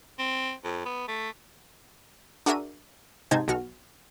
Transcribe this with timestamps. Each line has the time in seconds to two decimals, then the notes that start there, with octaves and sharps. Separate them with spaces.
0.19 C4
0.64 F2
0.85 B3
1.08 A3
2.46 D4 F#4 G#4 A#4 E5 D#7
3.31 G#2 C3 D#4 C5 A5 G#6
3.48 B1 B2 F#4 F6